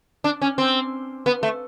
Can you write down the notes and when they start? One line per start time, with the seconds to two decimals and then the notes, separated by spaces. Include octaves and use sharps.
0.24 D4
0.42 C#4
0.58 C4
1.26 B3
1.43 A3